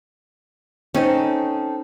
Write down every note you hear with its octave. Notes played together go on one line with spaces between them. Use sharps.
C4 C#4 D#4 A4